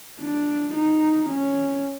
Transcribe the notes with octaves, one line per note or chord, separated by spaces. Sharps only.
D4
D#4
C#4